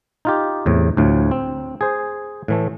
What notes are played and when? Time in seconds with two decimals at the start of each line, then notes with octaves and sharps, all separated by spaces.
0.25 D#4 F4 G4
0.66 E2 A2 C3
0.97 D2 A2 F3
1.31 C4
1.81 G#4 C5
2.48 A2 E3 A3